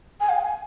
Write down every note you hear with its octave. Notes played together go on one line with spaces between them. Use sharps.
G#5
F5
G#5